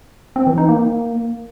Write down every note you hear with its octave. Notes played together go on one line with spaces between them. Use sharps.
C4
E3
D#4
A#3